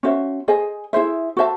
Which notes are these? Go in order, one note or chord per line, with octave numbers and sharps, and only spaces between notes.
C#4 F#4 C5 E5
G#4 C5 D#5 G#5
E4 G#4 C5 E5
F#4 C5 E5 A5